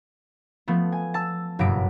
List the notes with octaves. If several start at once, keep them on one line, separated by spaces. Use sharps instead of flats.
F3 A3 B3
G#5
A5 E6
F#1 G2 B2 F#3 B6 D7